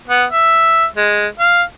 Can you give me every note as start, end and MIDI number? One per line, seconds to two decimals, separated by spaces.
0.08 0.25 59
0.30 0.86 76
0.96 1.27 56
1.39 1.62 77